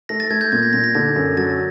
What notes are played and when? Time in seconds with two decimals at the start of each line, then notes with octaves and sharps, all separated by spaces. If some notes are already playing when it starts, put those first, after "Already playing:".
0.09 A3 A#6
0.20 A6
0.30 A3 G#6
0.41 G6
0.52 A#2 G#6
0.63 A#6
0.73 A#2 A#6
0.84 A#6
0.95 D3 A6
1.16 F#2
1.37 F#3 A6